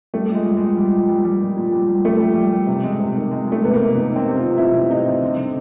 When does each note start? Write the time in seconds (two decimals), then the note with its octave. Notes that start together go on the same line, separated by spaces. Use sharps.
0.14 G3 A3
0.30 A#2
0.35 G#3
0.45 G3
0.57 A#2 G#3
0.77 G3
0.93 A#2
1.09 G3
1.25 G3
1.41 A#2
1.57 A#2
1.72 G3
1.88 G3
2.05 G3 A3
2.20 G3
2.35 G3
2.52 G3
2.67 C3
2.84 G#3
3.00 C3
3.16 D#3
3.31 G#3
3.47 G#3 A3
3.63 C3 B3
3.74 A#3
3.79 C3
3.95 D#3 B3
4.11 D#3
4.16 C4
4.26 C3
4.37 F4
4.43 D#3
4.58 C3 E4
4.74 C3
4.90 C3 D#4
5.06 C3
5.22 D3
5.37 D3